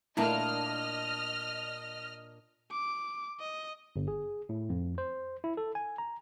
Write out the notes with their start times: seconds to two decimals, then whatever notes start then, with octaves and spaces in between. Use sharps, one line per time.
0.17 A#2 A3 A#3 D4 E4 D#5 F6
2.71 D6
3.40 D#5
3.96 G1
4.08 G#4
4.49 A2
4.70 F2
4.98 C5
5.44 E4
5.57 A4
5.75 G#5
5.98 A#5